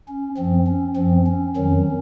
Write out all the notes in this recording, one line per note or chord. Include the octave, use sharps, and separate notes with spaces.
C#4
F#2 F3 C4
C#4
F#2 F3 C4
C#4
F2 D#3 F#3 C#4